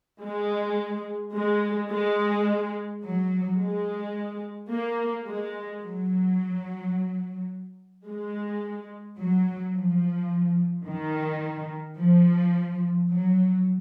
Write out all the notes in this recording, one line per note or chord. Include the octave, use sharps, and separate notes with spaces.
G#3
G#3
G#3
F#3
G#3
A#3
G#3
F#3
G#3
F#3
F3
D#3
F3
F#3